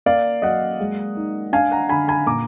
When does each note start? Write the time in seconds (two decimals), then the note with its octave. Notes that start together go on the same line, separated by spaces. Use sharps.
0.06 A#3 D5 F5
0.42 F#3 D#5 F#5
0.80 G#3
1.17 D#4
1.53 D4 F5 G#5
1.71 F#5 A#5
1.89 D3 G#5 B5
2.08 G#5 B5
2.26 A#2 A#5 D6